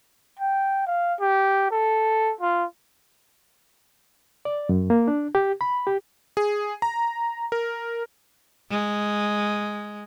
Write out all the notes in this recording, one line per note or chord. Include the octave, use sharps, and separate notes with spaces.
G5
F5
G4
A4
F4
D5
F#2
A#3
D4
G4
B5
G4
G#4
A#5
A#4
G#3